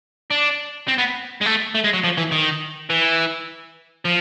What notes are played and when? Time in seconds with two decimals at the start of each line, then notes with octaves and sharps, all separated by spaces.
0.31 D4
0.88 C4
0.98 B3
1.41 G#3
1.46 A3
1.75 A3
1.84 G#3
1.94 F#3
2.04 F3
2.18 E3
2.32 D#3
2.90 E3
4.05 F3